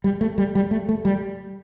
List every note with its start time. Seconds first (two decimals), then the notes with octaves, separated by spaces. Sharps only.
0.04 G3
0.21 A3
0.38 G3
0.55 G3
0.71 A3
0.89 A3
1.05 G3